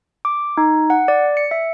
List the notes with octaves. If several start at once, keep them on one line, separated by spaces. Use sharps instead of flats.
D6
D#4
F#5
D5
C#7
E5